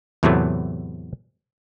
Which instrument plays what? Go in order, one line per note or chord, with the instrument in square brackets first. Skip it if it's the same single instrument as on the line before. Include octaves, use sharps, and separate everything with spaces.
[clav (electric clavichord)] E2 A2 C3 E3 F#3 A3